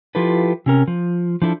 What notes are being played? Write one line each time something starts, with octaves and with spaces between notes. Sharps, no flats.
F3 E4 F4 G4 A4 B4
C3 C#4 A#4
F3
F3 D4 E4 A4